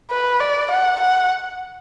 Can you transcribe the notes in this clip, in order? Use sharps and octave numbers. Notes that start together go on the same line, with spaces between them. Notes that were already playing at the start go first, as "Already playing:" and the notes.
B4
D5
F#5
F#5